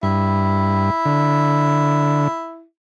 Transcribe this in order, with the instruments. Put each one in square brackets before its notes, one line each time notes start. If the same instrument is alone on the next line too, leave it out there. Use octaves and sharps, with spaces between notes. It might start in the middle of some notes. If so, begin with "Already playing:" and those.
[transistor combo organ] G2 [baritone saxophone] E4
[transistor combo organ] D3